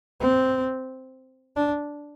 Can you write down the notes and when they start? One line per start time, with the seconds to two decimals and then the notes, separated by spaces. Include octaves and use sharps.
0.20 C4
1.56 D4